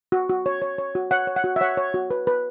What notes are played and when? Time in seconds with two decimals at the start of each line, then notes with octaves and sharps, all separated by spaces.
0.12 F#4
0.29 F#4
0.46 C#5
0.62 C#5
0.78 C#5
0.95 F#4
1.11 C#5 F#5
1.27 C#5
1.36 F#5
1.44 F#4
1.56 E5
1.61 C#5 F#5
1.77 C#5
1.94 F#4
2.11 B4
2.27 B4